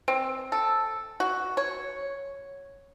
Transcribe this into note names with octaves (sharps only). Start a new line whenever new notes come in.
C4
A4
F#4
C#5